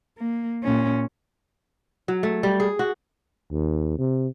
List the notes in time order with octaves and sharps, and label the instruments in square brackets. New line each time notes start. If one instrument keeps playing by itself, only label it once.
[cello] A#3
A#2 C#4
[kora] F#3
A3
G3
G#4
F#4
[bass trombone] D#2
C3